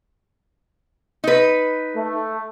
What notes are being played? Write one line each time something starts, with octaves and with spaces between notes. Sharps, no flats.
D#4 B4
A3